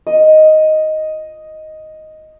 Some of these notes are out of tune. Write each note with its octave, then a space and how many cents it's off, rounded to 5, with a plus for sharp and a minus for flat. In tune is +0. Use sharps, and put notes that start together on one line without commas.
D#5 +5